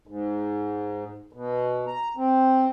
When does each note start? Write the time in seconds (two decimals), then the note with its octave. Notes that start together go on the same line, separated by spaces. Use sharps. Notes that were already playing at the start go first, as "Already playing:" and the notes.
0.07 G#2
1.33 B2
1.87 A#5
2.17 C4